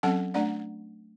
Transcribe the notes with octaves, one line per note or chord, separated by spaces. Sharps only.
F#3 C4 C#4 A4 F#5 A5
A3 D4 D5 F#5